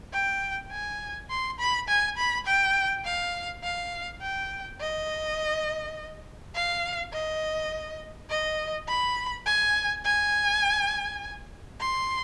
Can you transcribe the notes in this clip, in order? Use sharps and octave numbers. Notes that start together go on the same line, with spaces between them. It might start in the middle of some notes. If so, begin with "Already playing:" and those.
G5
G#5
C6
B5
G#5
B5
G5
F5
F5
G5
D#5
F5
D#5
D#5
B5
G#5
G#5
C6